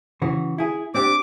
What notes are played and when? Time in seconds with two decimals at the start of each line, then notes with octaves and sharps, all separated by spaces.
0.22 C#3 E3 F#4
0.58 E4 G#4
0.95 C4 D4 G4 D6